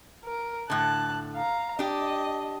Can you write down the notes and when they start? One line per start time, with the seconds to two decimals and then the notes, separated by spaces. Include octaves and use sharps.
0.25 A#4
0.70 A2 D3 A5 F#6
1.35 F5 A#5
1.79 D4 G4 D#5